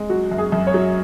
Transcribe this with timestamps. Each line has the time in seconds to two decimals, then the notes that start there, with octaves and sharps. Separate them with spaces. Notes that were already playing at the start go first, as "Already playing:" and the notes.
Already playing: G#3
0.09 F#3 F#4
0.31 F#2
0.38 G#4
0.52 F#2
0.67 C#5
0.74 F#3